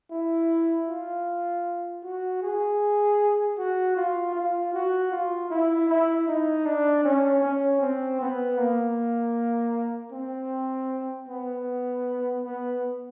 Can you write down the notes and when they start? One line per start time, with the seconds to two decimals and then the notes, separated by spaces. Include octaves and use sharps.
0.11 E4
0.88 F4
2.04 F#4
2.42 G#4
3.58 F#4
3.96 F4
4.35 F4
4.73 F#4
5.12 F4
5.50 E4
5.89 E4
6.28 D#4
6.66 D4
7.04 C#4
7.42 C#4
7.81 C4
8.21 B3
8.58 A#3
10.12 C4
11.29 B3
12.43 B3